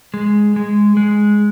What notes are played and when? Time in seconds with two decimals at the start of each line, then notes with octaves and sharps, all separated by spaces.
0.14 G#3
0.56 G#3
0.97 G#3